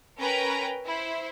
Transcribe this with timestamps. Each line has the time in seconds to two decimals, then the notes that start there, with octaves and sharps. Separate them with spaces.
0.18 C#4 A#4 B4 G5 A#5
0.86 E4 C5